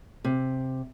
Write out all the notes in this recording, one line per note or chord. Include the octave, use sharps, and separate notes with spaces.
C3